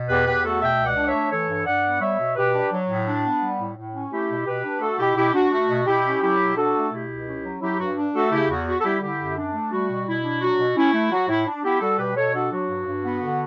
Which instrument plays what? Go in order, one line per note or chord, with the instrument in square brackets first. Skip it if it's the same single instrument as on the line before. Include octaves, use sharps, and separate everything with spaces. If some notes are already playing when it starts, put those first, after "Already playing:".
Already playing: [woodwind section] B2
E2 G4 B4
E2 G4 B4
A3 F#4 A4
B2 E5 G5
C#2
D5 F#5
D4
C#5 E5
A3
E3 A4 C#5
G2
G2 D5 F#5
B3
G3 C#5 E5
B2
B2 G4 B4
D4
F#3
A2
D4
B3
G3
A2
A2
C#4
A3 E4 G4
B2
B2 G4 B4
D4
A3 F#4 A4
B2 E4 G4
B2 E4 G4
D4 F#4
A3 F#4
B2
B2 E4 G4
C#4
F#3 E4 G4
B2
D4 F#4 A4
A3
B2 E4 G4
C#2
C#4
F#3
F#3 E4 G4
G2 F#4
D4
A3 F#4 A4
C#3 E4 G4
E2 F#4
B3 F#4
A4
G3 E4 G4
D3 E4 G4
F#2
D4
A3
G3 F#4
B2
B2 E4
D4
F#3 F#4
B2
C#4 E4
A3
F#3 F#4
A2 E4
D4
B3 E4 G4
G3 F#4 A4
B2 G4 B4
B2 A4 C#5
D4 F#4 A4
F#3 F#4
G2
G2
B3
D3